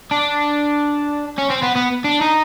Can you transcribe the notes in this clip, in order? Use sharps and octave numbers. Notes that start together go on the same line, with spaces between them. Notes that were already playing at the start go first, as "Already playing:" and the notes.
D4
C#4
C4
B3
B3
D4
D#4